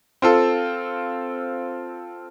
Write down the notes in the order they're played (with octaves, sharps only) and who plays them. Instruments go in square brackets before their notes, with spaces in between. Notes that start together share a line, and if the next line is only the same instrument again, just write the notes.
[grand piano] C4 F4 A4